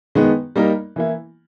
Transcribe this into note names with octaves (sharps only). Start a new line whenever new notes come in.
D#3 G#3 B3
G3 A#3 D#4 A#4
E3 A#3 E4